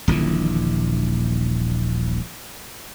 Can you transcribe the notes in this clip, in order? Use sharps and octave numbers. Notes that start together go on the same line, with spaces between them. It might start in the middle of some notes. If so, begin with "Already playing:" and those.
D#1 A#1 D3 E3